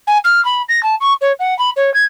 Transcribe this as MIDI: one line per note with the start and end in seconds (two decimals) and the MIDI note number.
0.07 0.18 80
0.24 0.43 89
0.45 0.62 83
0.68 0.83 94
0.83 0.95 81
1.00 1.13 85
1.21 1.32 73
1.39 1.57 78
1.58 1.70 83
1.76 1.93 73
1.94 2.04 92